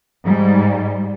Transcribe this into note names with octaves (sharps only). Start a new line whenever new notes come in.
G#2 G3